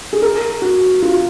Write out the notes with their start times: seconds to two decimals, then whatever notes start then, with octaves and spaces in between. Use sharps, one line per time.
0.13 G#4
0.22 A#4
0.62 F#4
1.02 F4